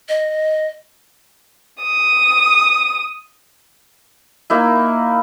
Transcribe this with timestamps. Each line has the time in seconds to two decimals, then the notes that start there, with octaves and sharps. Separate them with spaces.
0.09 D#5
1.82 D#6
4.50 A#3 D#4 E4